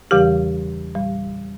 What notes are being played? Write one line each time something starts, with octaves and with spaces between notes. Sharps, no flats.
E2 C#3 E3 G3 G4
A#2 G3